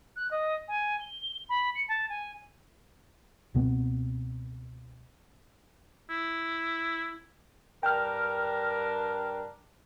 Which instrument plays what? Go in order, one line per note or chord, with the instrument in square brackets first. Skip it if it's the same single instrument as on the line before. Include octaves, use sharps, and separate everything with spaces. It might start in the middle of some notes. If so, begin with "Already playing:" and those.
[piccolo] F#6
D#5
G#5
G7
B5
C#7
A5
G#5
[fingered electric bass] C#2 B2 B3 C4
[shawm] E4
[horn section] G2 D4 A#4 [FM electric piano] G5 F6